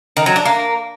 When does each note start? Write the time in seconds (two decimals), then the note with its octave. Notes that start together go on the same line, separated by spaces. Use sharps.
0.17 D#3
0.26 F#3
0.36 D4
0.45 A#3